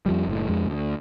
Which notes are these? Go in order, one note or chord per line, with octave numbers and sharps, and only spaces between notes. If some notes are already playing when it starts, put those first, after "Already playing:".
F2 F3 G3
F#1 A2
F2 G#3
D2